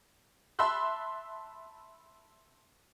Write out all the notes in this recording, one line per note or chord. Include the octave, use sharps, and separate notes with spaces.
E5 A5 B5 C6 E6 F#6